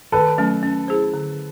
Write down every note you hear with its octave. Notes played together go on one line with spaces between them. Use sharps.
D#3 A4 B4
F#3 A3 C#4
C#4
E4 G#4 C5
D3